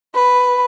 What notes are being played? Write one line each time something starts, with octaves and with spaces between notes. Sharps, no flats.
B4